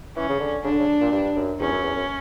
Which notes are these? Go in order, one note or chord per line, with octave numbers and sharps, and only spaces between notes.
E3 C#4
C#3
D3
C#3 D4
D3
C#3
A#2
G2
F#2
E2 C#4
F#2
E2
F#2